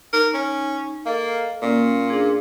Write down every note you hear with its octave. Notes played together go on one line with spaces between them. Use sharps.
D#4 A#4
C#4
A#3 A4 D#5
A#2 A#3 C#4
D4 G#4